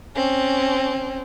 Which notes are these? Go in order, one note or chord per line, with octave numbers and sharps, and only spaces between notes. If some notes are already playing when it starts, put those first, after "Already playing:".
C4 C#4